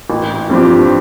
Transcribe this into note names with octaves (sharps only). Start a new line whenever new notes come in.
A1
G2 F3 C4 G4